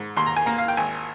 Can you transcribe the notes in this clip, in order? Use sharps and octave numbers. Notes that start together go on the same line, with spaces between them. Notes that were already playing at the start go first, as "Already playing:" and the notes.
Already playing: G#2
D#2 C6
A#5
G#5
A#3 A#5
F5
G5
G#1 G#5